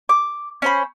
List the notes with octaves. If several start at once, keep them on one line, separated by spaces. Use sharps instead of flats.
D6
C#4 C5 B5